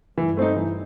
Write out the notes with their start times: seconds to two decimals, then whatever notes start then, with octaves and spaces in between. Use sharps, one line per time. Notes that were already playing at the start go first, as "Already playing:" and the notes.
0.18 G2 E3
0.37 A3 C4 D#4
0.56 E3